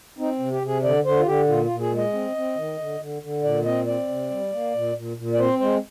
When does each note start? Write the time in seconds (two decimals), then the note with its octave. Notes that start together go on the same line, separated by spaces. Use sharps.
0.18 C4 D#4
0.39 C3
0.51 G4
0.62 C3 G#4
0.83 D3 D5
1.05 D3 C5
1.19 F4
1.26 D3 G4
1.48 A#2 F4
1.65 F4
1.70 A#2
1.80 G#4
1.92 G#3
1.97 D#5
2.13 C4
2.36 C4
2.56 D#3
2.79 D3
3.00 D3
3.22 D3
3.43 A#2 D5
3.65 C4 D#5
3.86 C4 D5
4.09 C3
4.30 G3
4.52 A#3
4.74 A#2
4.96 A#2
5.17 A#2
5.34 D5
5.39 C4 C5
5.60 G#3 C5